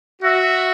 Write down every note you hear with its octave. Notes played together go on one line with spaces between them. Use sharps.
F#4 E5